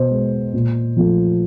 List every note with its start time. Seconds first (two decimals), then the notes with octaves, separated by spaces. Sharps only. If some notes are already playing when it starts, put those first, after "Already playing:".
Already playing: B2 C5
0.11 G#3
0.53 A#2
0.97 F3 A3